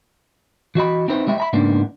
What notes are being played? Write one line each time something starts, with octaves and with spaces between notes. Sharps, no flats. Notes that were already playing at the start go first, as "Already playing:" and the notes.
E3 F#4 D#5 B5
C4 D#4 E4 B4 C5
G3 G#3 E4 E5
E5 A#5 B5
G#2 C#3 A#3 B3 D4